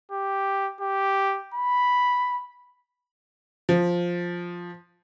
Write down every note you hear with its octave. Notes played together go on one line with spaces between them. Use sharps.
G4
G4
B5
F3